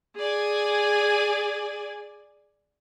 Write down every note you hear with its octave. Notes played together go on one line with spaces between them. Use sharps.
G#4 D5 G#5